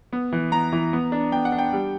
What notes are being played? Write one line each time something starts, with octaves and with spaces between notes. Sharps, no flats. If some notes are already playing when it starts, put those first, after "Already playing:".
B3
E3
B3 A#5
E3
B3
D4
B3 G5
F#5
D4
G5
G3